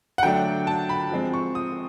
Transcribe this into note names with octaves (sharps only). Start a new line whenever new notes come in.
F#5
D3 F#3 A3 D4 G5
A5
B5
F3 G#3 C4
C#6
D#6